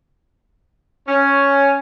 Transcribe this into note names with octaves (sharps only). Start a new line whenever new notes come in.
C#4